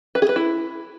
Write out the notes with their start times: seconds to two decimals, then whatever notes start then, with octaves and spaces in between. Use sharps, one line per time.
0.15 B4
0.22 G#4
0.29 B4
0.36 E4